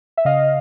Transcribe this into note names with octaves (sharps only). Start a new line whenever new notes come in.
E5
C#3 D#5 F5